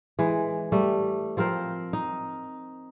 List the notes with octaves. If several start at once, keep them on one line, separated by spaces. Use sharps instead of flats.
E3 G#3
G3 A3
F3 C4 A#4 C5
D#4